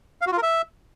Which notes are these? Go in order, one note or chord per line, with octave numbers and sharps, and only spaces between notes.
F5
F#4
F4
A#4
E5